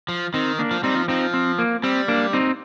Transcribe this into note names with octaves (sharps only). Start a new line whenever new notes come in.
F3
D#3 C4 D#4
A#3 D4
F3
G3 C4 D#4
F3
F3 C4 D#4
C4
A#3
G3 C4
A#3 D4
C4 D#4